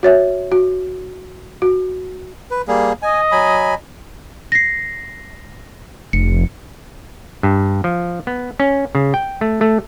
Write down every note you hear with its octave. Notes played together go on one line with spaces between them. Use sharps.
F#4 C#5 E5
F#4
F#4
B4
G3 A#3 G#4
D#5 G#5
F#3 G#5 B5
A#6 C7
F1 C#7
G2
F3
B3
C#4
C#3
G5
A3
A3